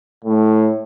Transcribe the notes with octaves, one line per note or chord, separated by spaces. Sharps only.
A2